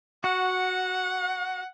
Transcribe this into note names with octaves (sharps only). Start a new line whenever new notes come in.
F#4 F#5